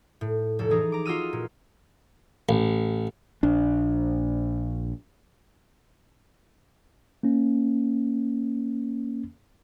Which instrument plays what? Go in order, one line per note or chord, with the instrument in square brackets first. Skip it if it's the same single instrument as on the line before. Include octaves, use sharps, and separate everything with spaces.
[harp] A2
F1 A4
E3 D#4 G#4 A#5
A#5 D6
F4 F#4 D#5 E6 F6 D#7
A#2
[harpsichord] A1
[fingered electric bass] A#1 D4
[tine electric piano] A#3 C#4